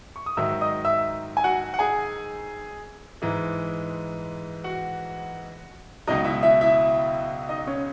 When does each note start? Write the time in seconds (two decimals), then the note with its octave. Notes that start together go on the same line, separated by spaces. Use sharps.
0.16 C#6
0.26 D#6
0.37 G#2 D#3 F#3 E5 E6
0.61 D#5 D#6
0.85 E5 E6
1.37 G#5
1.44 F#4 F#5
1.74 F#5
1.79 G#4 G#5
3.22 G#2 E3 G#3
4.64 F#4 F#5
6.07 C#2 B2 F#3 D#4 D#5
6.24 E4 E5
6.43 E4 E5
6.61 E4 E5
7.49 D#4 D#5
7.67 C#4 C#5